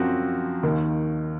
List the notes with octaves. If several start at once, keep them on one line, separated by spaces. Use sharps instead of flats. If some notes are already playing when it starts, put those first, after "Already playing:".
Already playing: F#2 F3 C4 F#4
D#2 D#3 A#3